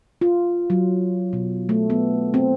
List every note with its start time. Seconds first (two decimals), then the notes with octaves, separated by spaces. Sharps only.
0.21 F4
0.70 F#3
1.33 B2
1.69 A3
1.90 B3
2.34 C4